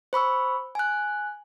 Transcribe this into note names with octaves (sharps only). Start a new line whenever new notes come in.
C5 B5 C#6 E6
G#5 F#6